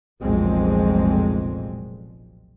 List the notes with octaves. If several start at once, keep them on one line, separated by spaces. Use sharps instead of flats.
F1 B1 F2 A#2 G#3 C4